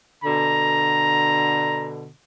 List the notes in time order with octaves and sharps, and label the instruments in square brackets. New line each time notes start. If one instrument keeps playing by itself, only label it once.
[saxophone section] B2 D3 [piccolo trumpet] A#5